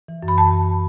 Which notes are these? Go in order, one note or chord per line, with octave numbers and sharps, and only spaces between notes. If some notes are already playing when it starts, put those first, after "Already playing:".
E3
F#2
B5
A5